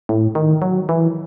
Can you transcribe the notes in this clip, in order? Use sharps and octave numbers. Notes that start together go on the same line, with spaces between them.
A2
D#3
F#3
E3